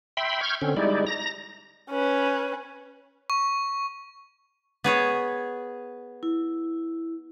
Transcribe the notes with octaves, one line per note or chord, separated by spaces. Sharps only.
E5 G5 B5 C6
C#6 F6 G6 G#6
D3 C4 C#4
G3 G#3 D#4 E4 D5
A#5 A#6
C#4 B4
C#6
B3 G#4 C#5
E4